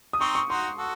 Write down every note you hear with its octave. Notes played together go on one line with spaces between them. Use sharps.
D#6
C4 D#4 C#6
C#6
D#4 F#4 C6
F#4 A4